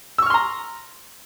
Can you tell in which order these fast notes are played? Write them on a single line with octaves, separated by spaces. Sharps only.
E6 C#6 F6 C6 A#5